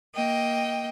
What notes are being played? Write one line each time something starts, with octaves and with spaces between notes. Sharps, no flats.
A#3 D#5 G5